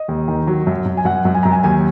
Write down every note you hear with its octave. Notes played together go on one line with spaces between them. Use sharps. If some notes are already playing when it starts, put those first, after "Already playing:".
Already playing: D#5
D#2
D#3
F#3
F#2
F#2
G#5
F#2 F#5
F#2
G#5
F#2 A#5
G#5
D#2 G#5